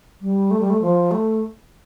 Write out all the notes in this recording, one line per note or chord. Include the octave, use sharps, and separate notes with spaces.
G3
A3
G3
A3
F3
A3